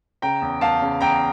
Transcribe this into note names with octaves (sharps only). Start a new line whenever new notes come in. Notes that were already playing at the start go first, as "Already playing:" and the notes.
C#3 G5 A#5
E2
E2 F5 A5
C#3
E2 G5 A#5